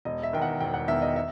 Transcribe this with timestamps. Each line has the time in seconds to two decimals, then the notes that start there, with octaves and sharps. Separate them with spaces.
0.05 E1 D#5
0.23 E5
0.33 D#3 G5
0.37 E2 F#5
0.61 E1 G5
0.74 F#5
0.88 E2 D#3 E5
1.02 D#5
1.16 E5